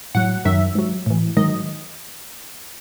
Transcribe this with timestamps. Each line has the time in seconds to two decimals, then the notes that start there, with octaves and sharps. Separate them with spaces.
0.15 A2 F#3 F#5
0.45 F#2 D#3 F#3 E5
0.75 G#2 F#3
1.06 A2 E3
1.37 G#2 D#3 F#3 D#5